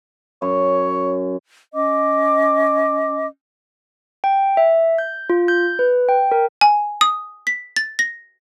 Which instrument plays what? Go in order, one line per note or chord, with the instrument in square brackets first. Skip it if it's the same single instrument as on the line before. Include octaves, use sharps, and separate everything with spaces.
[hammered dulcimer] F#2 [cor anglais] C#5
[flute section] C#4 D#5 D6
[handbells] G5
E5
G6
F4
G6
B4
G5
A#4
[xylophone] G#5
D#6
B6
A6
A#6